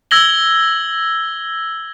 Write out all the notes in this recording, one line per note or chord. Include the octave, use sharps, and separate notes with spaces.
E6 G#6 A#6 F#7 G7